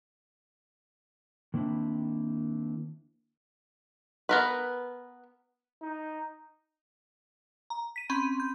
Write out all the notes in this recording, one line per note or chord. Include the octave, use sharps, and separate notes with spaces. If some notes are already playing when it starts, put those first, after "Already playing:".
D#3 A#3 C4 D4 E4
B3 A#4 B4
D#4
A#5
B6 D#7
C4 C#4 B5 C6 D#7
G6